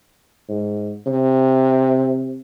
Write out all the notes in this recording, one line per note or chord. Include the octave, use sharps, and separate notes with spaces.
G#2
C3